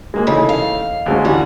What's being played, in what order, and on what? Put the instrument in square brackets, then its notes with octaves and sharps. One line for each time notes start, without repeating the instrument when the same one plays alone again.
[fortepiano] G#3 A#3 G#4
[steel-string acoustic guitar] C#3 [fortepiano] E3 A3 D#4
[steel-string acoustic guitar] F5
[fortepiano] D2 G#3 C#4
[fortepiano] D3 E3 [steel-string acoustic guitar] G3 F#4